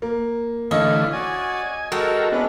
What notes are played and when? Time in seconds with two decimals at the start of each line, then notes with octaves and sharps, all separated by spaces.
0.02 A#3
0.71 D3 E3 A3 C#4 D#5 F5
1.13 F#4 D5 G#5
1.92 G#3 F#4 A4 A#4 G5
2.32 B3 C#4 D4 E4